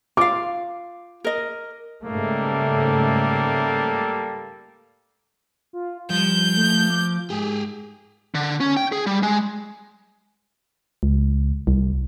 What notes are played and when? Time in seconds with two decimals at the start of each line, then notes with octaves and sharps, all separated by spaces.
0.17 F4 F5 D6
1.24 A#4 D#5
2.03 G#2 C#3 G3 A3 A#3 A4
5.73 F4
6.10 F3 G3 G6
6.57 A3
6.90 D6
7.30 G#2 G4 G#4
8.35 D3
8.60 C#4
8.77 G5
8.92 G#4
9.06 G3
9.23 G#3
11.03 C#2
11.67 C2